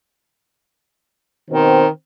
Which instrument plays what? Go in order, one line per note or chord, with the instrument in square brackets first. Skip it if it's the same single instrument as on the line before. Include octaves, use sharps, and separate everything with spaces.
[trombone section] B2 C4 [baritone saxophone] D#3